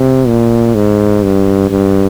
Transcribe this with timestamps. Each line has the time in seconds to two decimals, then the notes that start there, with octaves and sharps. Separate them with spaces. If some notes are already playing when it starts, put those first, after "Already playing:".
Already playing: C3
0.27 A#2
0.75 G#2
1.23 G2
1.70 G2